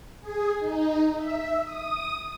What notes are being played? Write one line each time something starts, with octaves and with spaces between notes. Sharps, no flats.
G#4
D#4
E5
D#6